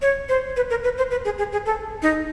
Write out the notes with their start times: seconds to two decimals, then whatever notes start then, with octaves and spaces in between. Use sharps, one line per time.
0.02 C#5
0.29 C5
0.56 B4
0.70 A#4
0.84 B4
0.98 C5
1.11 B4
1.25 G#4
1.38 G#4
1.52 G#4
1.66 A4
2.02 D#4